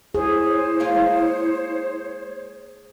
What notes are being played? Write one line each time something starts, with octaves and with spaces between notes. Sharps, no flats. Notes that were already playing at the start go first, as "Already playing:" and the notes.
E4 G#4 C5 C#5
G#3 A#3 F4